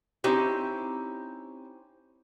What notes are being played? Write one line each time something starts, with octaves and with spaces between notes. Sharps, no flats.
C4 C#4 D#4 E4 G4 C5